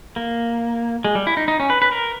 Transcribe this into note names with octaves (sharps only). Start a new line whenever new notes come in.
A#3
G#3
G3
E4
D#4
D#4
C#4
B4
B4
A#4